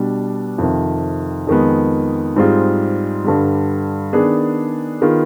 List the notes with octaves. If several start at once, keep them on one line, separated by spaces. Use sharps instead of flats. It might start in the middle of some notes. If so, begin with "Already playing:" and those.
Already playing: B2 G3 D4
F2 C3 D#3
F2 D#3 G#3 B3
G#2 G3 C4 F4 G#4
G2 D3 G3
D#3 B3 D4 G#4
D#3 B3 F4 G#4